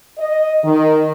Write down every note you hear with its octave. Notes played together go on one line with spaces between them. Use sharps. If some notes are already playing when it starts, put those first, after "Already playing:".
D#5
D#3